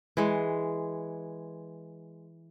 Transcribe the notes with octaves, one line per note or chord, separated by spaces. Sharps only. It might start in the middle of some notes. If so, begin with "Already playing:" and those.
E3 G#3